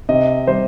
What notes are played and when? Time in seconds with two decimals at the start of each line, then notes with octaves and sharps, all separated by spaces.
0.09 C3 D#5
0.47 G3 C5